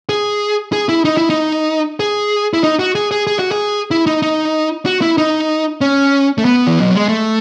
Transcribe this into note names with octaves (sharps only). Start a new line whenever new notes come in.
G#4
G#4
E4
D#4
E4
D#4
G#4
E4
D#4
F#4
G#4
G#4
G#4
F#4
G#4
E4
D#4
D#4
F#4
E4
D#4
C#4
A3
B3
E3
F#3
G#3
A3